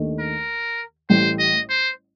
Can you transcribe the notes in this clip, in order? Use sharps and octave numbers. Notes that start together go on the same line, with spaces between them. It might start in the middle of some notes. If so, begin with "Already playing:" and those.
Already playing: D#2 D#3 A3 D4
A#4
A1 A2 G3 C5
D#5
C5